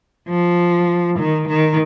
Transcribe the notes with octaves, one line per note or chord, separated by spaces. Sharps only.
F3
D#3
D#3